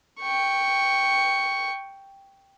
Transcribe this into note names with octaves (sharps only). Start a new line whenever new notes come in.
G5 C#6